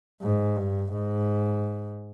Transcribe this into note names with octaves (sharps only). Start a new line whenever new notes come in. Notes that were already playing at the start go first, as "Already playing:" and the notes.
G#2
G2
G#2